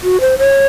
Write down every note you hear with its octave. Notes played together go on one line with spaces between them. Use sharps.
F#4
C5
C#5